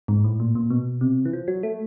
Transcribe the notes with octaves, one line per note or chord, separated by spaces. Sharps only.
G#2
A2
A#2
A#2
B2
C3
E3
F3
F#3
A3